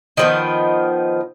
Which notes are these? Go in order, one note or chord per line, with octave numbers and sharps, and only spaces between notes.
D#3 F3 B3